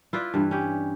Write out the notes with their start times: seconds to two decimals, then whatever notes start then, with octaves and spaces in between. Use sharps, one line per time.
0.13 E4 F4 B4 D5
0.34 G2 E3
0.51 C#4 G4